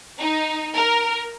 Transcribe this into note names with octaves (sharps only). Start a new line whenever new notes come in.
D#4
A#4